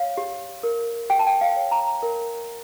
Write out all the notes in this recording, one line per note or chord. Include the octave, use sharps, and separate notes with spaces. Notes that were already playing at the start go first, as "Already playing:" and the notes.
Already playing: C#5 F5
G4
A#4
G4 G5
A5
G5
F5
C#5
A#5
A#4